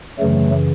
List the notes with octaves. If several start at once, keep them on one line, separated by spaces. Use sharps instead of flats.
F#2 C#3 E3 F#3 A3